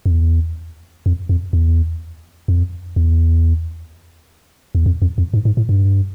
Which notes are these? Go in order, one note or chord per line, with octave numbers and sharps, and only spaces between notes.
F2
E2
F2
F2
E2
F2
E2
E2
F2
F2
F2
G#2
G#2
A2
G2